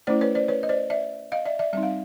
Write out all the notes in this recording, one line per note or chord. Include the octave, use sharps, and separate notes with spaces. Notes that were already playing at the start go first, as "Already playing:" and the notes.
A3 C#4 E4 C5 D5
B4 C#5
C5 D5
B4 C#5
D#5
C5 D5
D5 E5
D#5 F5
D5 E5
D5 E5
G3 C4 D#4 E5
F5